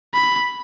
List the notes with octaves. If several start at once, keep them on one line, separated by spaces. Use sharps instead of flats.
B5